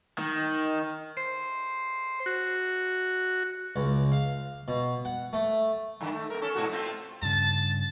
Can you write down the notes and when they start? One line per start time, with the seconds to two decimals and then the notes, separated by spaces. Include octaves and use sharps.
0.19 D#3
1.17 C5
2.26 F#4
3.76 C#2
4.12 F5
4.68 B2
5.05 F#5
5.33 A3
6.01 G2 D3 D#3
6.12 A3
6.30 B3 A#4
6.42 C#4 A4
6.55 G#2 B2 F#4
6.70 A3 C4 F4
7.23 G2 C#3 A5